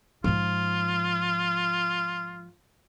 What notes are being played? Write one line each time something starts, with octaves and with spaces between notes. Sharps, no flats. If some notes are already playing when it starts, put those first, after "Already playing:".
G#2 F3 F4